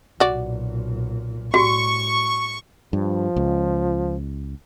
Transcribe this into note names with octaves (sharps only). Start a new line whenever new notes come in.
B1 A#2 F#4 D5
A2 G3 F#4 C#6
G2 F3
C#2